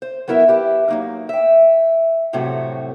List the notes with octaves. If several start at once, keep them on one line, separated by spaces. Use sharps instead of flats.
C5
F#3 B3 E4 A#4 E5
E4 G4 B4
F#3 A#3 D#4
E5 G5
F2 A2 C3 F#3 A3 F#4